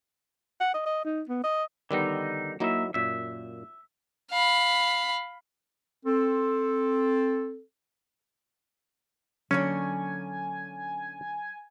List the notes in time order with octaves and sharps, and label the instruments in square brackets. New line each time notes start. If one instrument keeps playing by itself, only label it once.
[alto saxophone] F#5
D#5
D#5
D#4
B3
D#5
[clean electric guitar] D3 D#4 [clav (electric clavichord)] D#3 G3 B3
[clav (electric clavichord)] F#3 D#4 E4 [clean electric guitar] A#3 E5
[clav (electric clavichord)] F#2 A#2 [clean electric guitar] E5
[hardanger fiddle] F5 B5
[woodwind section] C4 A4
[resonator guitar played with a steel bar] D3 A#3 C#5 [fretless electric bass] F#3 [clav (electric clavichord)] C#4 [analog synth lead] G#5